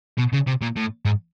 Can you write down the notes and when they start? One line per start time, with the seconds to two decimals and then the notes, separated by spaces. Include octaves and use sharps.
0.18 B2
0.33 C#3
0.47 C3
0.61 A#2
0.76 A2
1.05 G#2